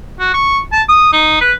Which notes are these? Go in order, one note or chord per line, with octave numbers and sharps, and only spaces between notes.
F#4
C#6
A5
D#6
D#4
B4